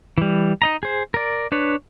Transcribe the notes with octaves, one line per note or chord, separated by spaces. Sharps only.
E3 G3
D#4 D#5 A#5
G#4 C5
A#4 D5
D4 B4 C#5